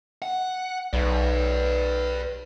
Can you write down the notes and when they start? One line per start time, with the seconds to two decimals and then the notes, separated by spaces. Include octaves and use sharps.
0.22 F#5
0.93 B1 B4 D5